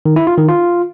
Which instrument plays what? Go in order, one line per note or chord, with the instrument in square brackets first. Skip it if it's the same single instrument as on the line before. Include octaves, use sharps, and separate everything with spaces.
[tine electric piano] D#3
E4
F4
D#3
F4